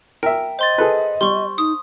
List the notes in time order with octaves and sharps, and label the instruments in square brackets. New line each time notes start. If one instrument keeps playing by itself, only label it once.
[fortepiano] A#4 E5 [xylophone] G5
[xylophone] C5 C6 A6 [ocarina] D#5
[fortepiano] G#4 A4 B4
[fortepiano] G3 [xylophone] C6 C#6
[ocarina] D#4 [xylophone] D#6